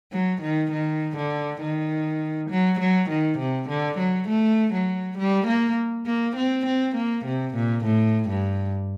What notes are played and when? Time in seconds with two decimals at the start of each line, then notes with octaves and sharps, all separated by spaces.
0.12 F#3
0.41 D#3
0.71 D#3
1.16 D3
1.61 D#3
2.50 F#3
2.79 F#3
3.09 D#3
3.38 C3
3.68 D3
3.98 F#3
4.28 A3
4.73 F#3
5.17 G3
5.47 A#3
6.06 A#3
6.36 C4
6.66 C4
6.95 A#3
7.25 C3
7.55 A#2
7.84 A2
8.29 G2